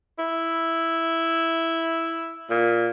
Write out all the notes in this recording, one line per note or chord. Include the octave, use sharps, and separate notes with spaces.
E4
A#2